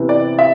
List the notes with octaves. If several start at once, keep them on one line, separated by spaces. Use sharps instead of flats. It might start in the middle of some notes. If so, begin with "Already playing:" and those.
Already playing: C3 E3 B3
D5
E5